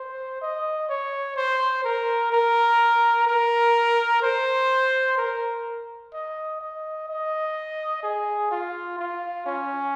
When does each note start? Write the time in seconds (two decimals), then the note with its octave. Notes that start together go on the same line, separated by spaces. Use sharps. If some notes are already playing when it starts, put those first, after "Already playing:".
Already playing: C5
0.41 D#5
0.89 C#5
1.36 C5
1.84 A#4
2.32 A#4
3.27 A#4
4.22 C5
5.18 A#4
6.13 D#5
6.61 D#5
7.08 D#5
8.03 G#4
8.51 F4
8.98 F4
9.46 C#4